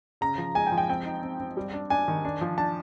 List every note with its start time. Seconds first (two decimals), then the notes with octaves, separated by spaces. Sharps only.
0.21 C#3 A#5
0.38 F3
0.55 G#3 G#5
0.67 G5
0.72 F3
0.77 G5
0.89 C4 G5
1.05 D#4
1.23 C4
1.40 C4
1.57 G3
1.73 D4
1.90 D4 G#5
2.08 D#3
2.25 D4
2.41 F3
2.58 D4 A5